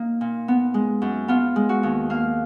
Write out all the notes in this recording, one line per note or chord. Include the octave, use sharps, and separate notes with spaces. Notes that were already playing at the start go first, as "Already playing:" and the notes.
Already playing: A#3 D#4
A#2
B3
G#3
F#2
B3 F4
G#3
F#4
D#2
A#3 F5